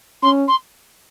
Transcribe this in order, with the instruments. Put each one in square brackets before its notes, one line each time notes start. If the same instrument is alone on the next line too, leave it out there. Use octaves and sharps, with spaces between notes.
[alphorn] C#4 [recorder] C6
[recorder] C6